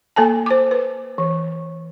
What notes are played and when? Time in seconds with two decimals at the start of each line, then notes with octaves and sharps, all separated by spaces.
0.16 A#3 A4 G#5 A5
0.46 C5 D6
0.71 B4
1.18 E3